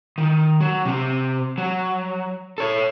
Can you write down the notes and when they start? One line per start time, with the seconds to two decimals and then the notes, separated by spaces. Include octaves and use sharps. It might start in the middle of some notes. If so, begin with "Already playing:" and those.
0.18 D#3
0.61 F#3
0.85 C3 C4
1.58 F#3
2.58 A4 C#5